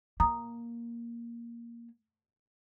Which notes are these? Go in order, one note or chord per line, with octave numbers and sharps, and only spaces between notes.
A#3 A#5 D#6